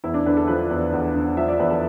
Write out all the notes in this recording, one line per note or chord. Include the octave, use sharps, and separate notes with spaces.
E2 E4
D4
D3 B4
A4
F3 B4
E2
E2
D3
F3 E5
D5
E2 B4
A4